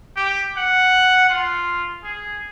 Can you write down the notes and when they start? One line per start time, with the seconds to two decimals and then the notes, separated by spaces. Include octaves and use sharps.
0.16 G4
0.57 F#5
1.30 F4
2.04 G#4